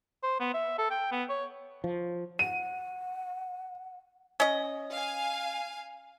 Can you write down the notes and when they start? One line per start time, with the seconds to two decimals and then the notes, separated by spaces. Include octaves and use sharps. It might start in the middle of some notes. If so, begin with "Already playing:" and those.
0.23 C5
0.40 B3
0.54 E5
0.78 A4
0.90 G5
1.12 B3
1.29 C#5
1.84 F3
2.39 F#5 D#7
4.40 C#4 D#5
4.92 F5 G#5